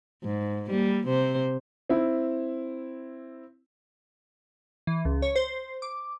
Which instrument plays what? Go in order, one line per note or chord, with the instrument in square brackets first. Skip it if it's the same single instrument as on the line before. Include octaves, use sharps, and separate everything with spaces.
[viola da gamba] G#2
G3 A#3
C3 C5
[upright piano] C4 E4
[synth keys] E3
C#2
C#5
C5
D6